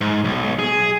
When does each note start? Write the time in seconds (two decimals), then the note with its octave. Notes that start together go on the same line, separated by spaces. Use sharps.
0.01 G#2
0.25 B1
0.59 G#4